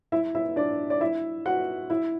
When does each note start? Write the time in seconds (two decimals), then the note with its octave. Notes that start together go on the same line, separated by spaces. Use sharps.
0.12 E4 E5
0.35 E4 E5
0.56 D4 D5
0.90 D5
1.01 E4 E5
1.45 F#4 F#5
1.90 E4 E5